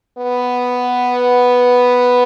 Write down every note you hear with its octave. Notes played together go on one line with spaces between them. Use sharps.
B3